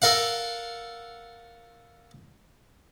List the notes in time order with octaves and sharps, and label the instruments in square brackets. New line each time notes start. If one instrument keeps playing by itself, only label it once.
[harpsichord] A4 A#4 F5 F#5